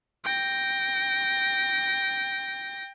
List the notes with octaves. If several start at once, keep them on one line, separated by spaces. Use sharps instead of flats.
G5 A#6